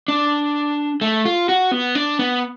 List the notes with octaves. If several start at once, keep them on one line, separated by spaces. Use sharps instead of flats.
D4
A3
F4
F#4
B3
D4
B3